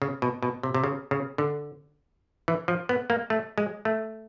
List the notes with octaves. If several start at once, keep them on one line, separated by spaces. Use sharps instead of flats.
C#3
B2
B2
C3
C3
C#3
C#3
D3
E3
F3
B3
A#3
A3
G#3
A3